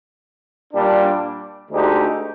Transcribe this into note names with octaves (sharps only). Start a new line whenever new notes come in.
A#2 G3 D4
D2 D3 G#3 D#4 G4